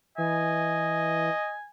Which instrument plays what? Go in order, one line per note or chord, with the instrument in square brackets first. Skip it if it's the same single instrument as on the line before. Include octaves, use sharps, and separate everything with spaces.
[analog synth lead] E3 [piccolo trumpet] D#5 [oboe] G#5